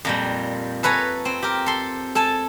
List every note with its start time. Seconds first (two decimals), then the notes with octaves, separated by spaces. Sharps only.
0.05 F2 A#2 G3
0.83 A4 B4 C#5 G#5 A#5
1.25 C4
1.42 G4 A#4
1.66 A4 C6
2.15 A4 G#5 A5